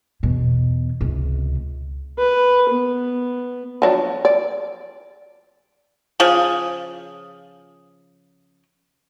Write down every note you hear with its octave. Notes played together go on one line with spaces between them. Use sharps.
E2 B2
C#2 C3
B4
B3
F3 F#3 D4
D5
C#3 F3 G#4